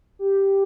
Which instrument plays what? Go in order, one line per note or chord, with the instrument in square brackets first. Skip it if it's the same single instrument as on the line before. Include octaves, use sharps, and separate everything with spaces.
[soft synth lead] G4